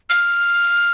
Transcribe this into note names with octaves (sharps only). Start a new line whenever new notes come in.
F6